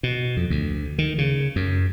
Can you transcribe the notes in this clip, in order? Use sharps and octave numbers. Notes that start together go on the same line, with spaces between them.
B2
F2
D2
D#3
C#3
F#2